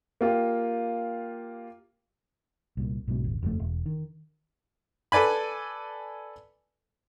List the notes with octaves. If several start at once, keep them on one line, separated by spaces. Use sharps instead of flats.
A#3 F4 G4
C2 A#2
B1 G#2 B2
D#1 G#1
F#1 F2 A#2 A3
E1
D#3
A4 B4 D5 G#5 B5